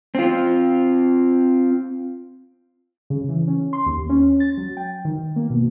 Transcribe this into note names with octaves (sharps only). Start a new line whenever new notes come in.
C4 F4
C#3
E3
C#4
C6
D#2
C#4
A6
F#3
G5
D#3
A#3
B2